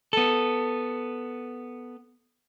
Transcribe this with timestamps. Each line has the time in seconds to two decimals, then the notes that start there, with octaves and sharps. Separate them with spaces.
0.13 B3 A4